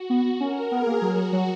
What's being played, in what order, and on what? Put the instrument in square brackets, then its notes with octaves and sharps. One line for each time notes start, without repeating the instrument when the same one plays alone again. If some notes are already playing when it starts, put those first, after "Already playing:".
Already playing: [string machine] F#4
[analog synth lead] B3
[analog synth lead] C#4 [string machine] A#4
[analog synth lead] B3 [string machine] G#4
[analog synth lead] A#3
[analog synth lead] F#3 [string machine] F#4
[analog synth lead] F#3